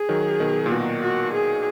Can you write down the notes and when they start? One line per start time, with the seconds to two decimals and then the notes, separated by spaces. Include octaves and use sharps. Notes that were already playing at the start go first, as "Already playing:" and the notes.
Already playing: G#4
0.09 D#3 F#3
0.40 B2 D#3
0.66 A#2
0.71 B2 F#4
1.02 F#4
1.33 G#4